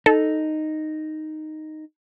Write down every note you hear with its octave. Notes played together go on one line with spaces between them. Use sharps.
D#4 A4